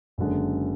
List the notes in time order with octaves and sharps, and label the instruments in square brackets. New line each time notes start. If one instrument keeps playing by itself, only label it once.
[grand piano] F#1 F#2 D3 G#3